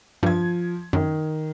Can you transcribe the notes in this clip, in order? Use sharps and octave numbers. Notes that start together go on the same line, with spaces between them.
G2 F3 G#6
F#2 D#3